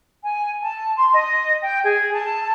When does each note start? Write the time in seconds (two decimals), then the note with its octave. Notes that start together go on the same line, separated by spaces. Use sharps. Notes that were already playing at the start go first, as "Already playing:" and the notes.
0.24 G#5
0.63 A5
0.96 C6
1.14 D#5
1.63 G5
1.85 G#4
2.13 A5